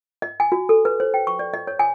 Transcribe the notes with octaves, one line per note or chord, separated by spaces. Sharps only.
D#5
G#5
F#4
A4
B4
C5
G5
C#6
D5
D#5
C#5
G#5